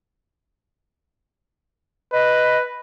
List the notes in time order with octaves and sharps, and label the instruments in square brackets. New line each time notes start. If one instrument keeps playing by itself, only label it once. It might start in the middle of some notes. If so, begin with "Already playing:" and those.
[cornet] B4 [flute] D#5